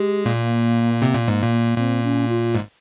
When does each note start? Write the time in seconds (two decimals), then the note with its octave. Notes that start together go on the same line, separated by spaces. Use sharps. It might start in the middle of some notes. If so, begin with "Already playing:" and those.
Already playing: G#3 G4
0.26 A#2 A#3
1.02 C3
1.15 A#2
1.28 G#2
1.42 A#2
1.78 A#2 C4
2.04 C#4
2.29 F4
2.55 G#2